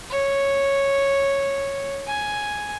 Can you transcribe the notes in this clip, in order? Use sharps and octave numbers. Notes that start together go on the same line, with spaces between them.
C#5
G#5